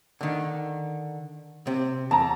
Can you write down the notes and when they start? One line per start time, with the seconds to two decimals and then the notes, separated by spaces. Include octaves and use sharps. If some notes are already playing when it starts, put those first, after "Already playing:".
0.21 D3 D#3
1.67 C3
2.11 E2 A5 A#5